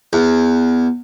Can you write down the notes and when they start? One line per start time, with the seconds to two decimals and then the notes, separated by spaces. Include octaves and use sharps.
0.13 E2